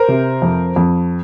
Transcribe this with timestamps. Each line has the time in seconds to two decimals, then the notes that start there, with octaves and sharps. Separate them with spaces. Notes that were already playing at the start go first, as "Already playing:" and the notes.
Already playing: A#4 C5
0.08 C3
0.42 F2
0.76 F2